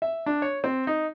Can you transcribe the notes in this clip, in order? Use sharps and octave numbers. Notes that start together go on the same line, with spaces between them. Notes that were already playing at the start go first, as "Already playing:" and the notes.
E5
D4
C#5
C4
D#4